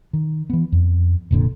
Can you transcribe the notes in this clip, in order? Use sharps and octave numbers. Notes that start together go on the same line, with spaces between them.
D#3
E3 B3
F2
F1 A#2 D3